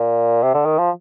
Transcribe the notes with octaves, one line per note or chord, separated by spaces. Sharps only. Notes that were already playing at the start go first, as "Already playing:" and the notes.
Already playing: A#2
C3
D3
D#3
F3